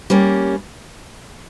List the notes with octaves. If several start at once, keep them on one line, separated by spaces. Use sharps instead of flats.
G3 A#3 C#4